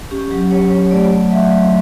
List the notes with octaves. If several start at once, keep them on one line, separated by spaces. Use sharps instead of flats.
C#4 G4
F#3 G4
C#4 C#5
F#3 C#5
A3 D5
A3
F#3 E5
F#3